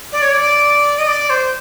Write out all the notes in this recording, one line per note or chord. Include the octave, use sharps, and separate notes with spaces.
D5
C#5
D5
D#5
D5
C5